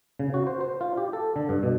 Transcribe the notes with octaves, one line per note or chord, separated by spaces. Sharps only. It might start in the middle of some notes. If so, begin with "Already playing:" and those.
C#3
F#4
C5
C5
F4
G4
A4
D3
G2
B2